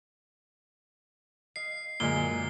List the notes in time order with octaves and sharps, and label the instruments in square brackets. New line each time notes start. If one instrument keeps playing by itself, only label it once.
[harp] D#5 F5 [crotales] C7
[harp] F#2 D3 E6 [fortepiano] A#2 G#3 [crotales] G7